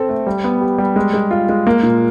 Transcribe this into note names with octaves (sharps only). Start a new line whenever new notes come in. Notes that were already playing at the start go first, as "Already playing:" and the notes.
Already playing: C4 A4
A3
G3
B3
G4
G3
G#3
G#3
F4
G#3
A#3
A#2